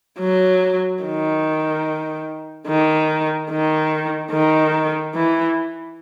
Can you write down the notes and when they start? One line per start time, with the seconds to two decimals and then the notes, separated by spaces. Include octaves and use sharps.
0.19 F#3
1.03 D#3
2.67 D#3
3.51 D#3
4.32 D#3
5.15 E3